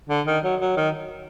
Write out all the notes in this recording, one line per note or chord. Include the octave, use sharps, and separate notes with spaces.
D3
D#3
F#3
F#3
D#3